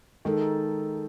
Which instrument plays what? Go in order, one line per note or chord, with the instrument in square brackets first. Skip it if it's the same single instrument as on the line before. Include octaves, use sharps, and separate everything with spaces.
[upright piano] D#3 [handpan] G#3 D#4 A4